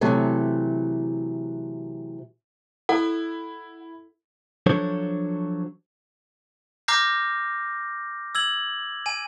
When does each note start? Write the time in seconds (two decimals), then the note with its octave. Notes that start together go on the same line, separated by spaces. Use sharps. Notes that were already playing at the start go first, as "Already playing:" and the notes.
0.01 C3 E3 F#3 A3
2.89 E4 A4 F#5
4.66 F3 F#3 D4 A4 C5 C#5
6.88 A#5 D6 F6 G6 A#6 C7
8.35 E6 G#6 F#7
9.06 G#5 D#7